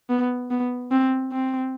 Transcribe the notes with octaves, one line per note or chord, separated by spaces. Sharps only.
B3
B3
C4
C4